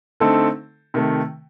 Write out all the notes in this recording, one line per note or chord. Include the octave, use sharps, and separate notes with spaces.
D3 A3 C4 D#4 A4
C3 D#3 A3